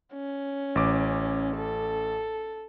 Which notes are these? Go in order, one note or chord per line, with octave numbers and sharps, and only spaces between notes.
C#4
A1 D6
A4